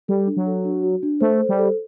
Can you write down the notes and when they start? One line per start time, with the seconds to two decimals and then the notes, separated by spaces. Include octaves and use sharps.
0.08 G3 A4
0.27 D4
0.37 F#3
0.47 A4
0.65 D4
0.83 F#4
1.03 D4
1.21 A3 C5
1.40 A4
1.49 G3
1.58 A4